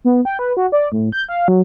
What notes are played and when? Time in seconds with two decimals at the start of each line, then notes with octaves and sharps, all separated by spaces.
0.05 B3
0.25 G5
0.39 B4
0.57 F#4
0.72 D5
0.92 A2
1.12 G6
1.29 F5
1.48 F#3